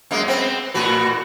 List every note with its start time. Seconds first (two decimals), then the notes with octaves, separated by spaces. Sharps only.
0.11 F#2 G#3 A#3
0.28 B3 C4
0.74 A2 F#4 B4